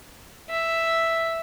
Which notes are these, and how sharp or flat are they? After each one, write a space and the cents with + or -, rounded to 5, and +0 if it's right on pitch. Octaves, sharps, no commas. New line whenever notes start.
E5 +0